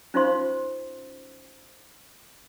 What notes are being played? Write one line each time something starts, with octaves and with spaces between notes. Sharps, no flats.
C#4 D#4 F4 C5 F5 C6